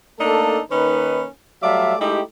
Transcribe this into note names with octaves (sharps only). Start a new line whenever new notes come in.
A3 A#3 D4 D#4 A4
D#3 A#3 C#4 D#4 B4
F#3 G3 A3 D5 E5 F5
G#3 A3 D#4 E4 G4